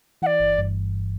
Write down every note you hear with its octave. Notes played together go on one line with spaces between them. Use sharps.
E3 D5 F#5
G1
G2